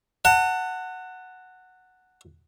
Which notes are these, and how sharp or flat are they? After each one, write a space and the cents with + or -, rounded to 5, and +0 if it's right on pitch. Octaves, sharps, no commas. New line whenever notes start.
F#5 +0 A5 +40